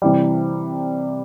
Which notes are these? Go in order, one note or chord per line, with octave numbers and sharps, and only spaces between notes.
C3 E3 G3